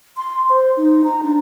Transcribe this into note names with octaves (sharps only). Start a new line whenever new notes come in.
C6
C5
D#4
A#5
D4